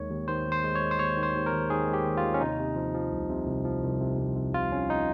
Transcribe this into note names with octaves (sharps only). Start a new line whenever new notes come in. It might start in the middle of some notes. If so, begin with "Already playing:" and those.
Already playing: D#2 D#3 G#3 C#5
D#2
D#3 C5
D#2
C5
G#3
C#5
G#3
C5
D#2 C#5
D#3
C5
D#2
A#4
D#2
D#3 G#4
G#3
G4
D#2
F4
D#2
C#4
C3 D#4
C3
F3
F3
C2
C3
C2
F3
C2
C3
C2
C3
C2 F4
C2 C#4
D#4